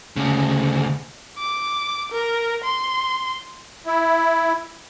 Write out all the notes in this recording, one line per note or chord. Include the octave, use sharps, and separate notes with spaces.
D2 C#3
D6
A#4
C6
E4